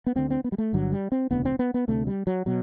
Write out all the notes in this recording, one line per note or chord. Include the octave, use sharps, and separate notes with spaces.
B3
D2 D3 C4
C4
B3
G3
A3
G1 G2 D3 F#3
G3
C4
E1 D2 C3 B3
C4
B3
B3
D2 C3 A3
G3
F#3
B2 F#3